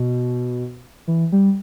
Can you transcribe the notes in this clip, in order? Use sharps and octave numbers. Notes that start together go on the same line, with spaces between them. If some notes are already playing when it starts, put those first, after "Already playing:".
Already playing: B2
E3
G3